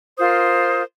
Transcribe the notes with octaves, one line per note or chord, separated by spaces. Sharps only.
F4 A#4 C5 D#6